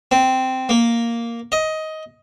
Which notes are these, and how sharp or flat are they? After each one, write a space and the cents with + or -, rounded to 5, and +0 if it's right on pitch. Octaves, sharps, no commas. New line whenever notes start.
C4 -10
A#3 +0
D#5 +15